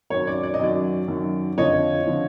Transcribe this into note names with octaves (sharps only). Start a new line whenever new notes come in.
F#2 D#3 F#3 C#5
D5
D5
D#5
F#2 D#3 F#3 D5
F#2 D#3 F#3
F2 D3 F3 C#5 D#5
D3 F3